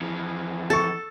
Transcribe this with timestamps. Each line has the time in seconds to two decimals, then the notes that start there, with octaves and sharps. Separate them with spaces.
0.01 F2 E3
0.70 A4 C#6 A6